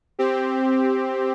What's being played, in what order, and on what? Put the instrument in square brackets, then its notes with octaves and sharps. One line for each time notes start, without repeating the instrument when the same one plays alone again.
[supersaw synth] C4 G4